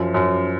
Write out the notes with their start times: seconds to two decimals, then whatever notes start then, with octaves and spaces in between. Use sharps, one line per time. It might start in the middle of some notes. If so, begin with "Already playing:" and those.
Already playing: F#2 F3
0.14 F#2